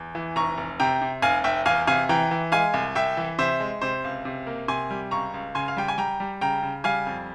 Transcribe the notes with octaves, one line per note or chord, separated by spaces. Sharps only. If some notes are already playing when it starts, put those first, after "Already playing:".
Already playing: E2
E3
F1 A#5 C#6
F1
C3 G5 A#5
C3
F1 F5 G#5
F1 E5 G5
E2 F5 G#5
C3 F5 G#5
E3 G5 A#5
E3
G#3 F5 G#5
C2
C2 E5 G5
E3
C3 C5 E5
G#3
C3 C5
C#2
C3
A#3
C3 G#5 C6
G3
C#2 A#5 C#6
C#2
C#3 G#5 C6
F5
G3 G5
G#5
G3 G5 A#5
G3
C#3 G5 A#5
C#3
G3 F5 G#5
F2